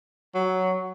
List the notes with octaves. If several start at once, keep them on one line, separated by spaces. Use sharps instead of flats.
F#3